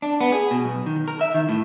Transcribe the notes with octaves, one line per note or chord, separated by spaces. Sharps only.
D4
B3
G#4
B2
B1
D#3
A#4
E5
D#3
A2